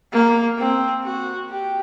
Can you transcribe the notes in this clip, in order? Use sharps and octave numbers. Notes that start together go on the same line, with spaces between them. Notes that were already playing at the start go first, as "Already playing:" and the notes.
A#3
C4
F#4
G4